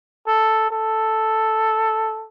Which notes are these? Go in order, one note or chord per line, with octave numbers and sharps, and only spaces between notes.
A4
A4